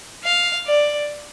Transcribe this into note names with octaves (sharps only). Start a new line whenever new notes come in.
F5
D5